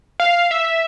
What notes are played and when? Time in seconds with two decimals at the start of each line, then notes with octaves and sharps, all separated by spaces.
0.20 F5
0.51 E5